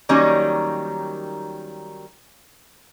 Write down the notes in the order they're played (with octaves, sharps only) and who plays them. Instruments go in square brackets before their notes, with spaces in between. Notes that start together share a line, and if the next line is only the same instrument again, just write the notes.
[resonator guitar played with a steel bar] D#3 F#3 G3 A#3 C#4 D#4